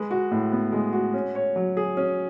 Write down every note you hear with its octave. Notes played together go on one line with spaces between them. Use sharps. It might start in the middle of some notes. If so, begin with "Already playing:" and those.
Already playing: G#3 B4
F#4
A2
B3
G#3
F#4
C#4
C#5
F#3
G#4
C#4